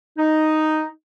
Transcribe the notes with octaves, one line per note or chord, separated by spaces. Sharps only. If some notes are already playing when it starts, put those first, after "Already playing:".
D#4